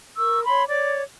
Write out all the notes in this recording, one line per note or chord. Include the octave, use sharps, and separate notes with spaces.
A#4 C#6 E6
C#5 B5 C6
C#5 D5 D6